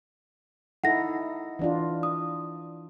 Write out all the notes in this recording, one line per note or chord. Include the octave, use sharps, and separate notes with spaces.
D#4 E4 A4 F#5 A#6
E3 D4 F4
D#6